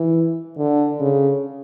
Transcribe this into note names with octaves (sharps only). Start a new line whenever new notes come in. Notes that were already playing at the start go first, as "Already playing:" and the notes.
Already playing: E3
D3
C#3